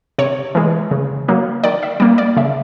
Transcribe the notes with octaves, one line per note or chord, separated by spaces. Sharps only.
C3 C#5
E3 G#3
C#3
F#3 A#3
D#3 D5
E5
G3 A#3 D5
D5
C#3 E5